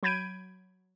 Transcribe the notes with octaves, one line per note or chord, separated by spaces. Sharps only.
F#3 B5 G6 G#6 D7 D#7